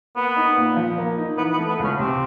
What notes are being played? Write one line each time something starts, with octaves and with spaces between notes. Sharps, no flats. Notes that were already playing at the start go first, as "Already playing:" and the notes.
A#3 B3
D#4
A#2
F3
A#3
D#4
E3 B3
B3
A3
B3
C#2 C#4
C3 C4